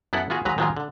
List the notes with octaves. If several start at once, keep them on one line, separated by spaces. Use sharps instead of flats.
F#2 B3 E4 A4 F#5
B3 F4 F#4 G#4
D#2 F#3 G#3 B4 A#5
D#3 F3 F#3 G#3 A#3 F4
D3